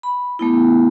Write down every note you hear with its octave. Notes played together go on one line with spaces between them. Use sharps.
B5
A3 B3 E4